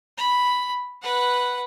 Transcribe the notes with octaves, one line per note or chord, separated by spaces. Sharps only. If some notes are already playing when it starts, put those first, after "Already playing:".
B5
B4 F#5